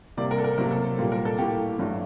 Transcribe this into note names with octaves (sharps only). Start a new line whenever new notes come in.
C3 G3 A#3 D5
A#4
A4
A#4
C3 F#3 A#3 A#4
A4
A#2 G3 A#3
A#4
A4
A2 G3 A#3 G4
G2 F#3 A3